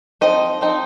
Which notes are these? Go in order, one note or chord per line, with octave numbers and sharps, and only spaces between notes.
F3 C4 D#4 D#5
F3 C4 D#4